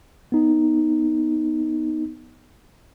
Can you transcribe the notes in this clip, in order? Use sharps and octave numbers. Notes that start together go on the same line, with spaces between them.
B3 D#4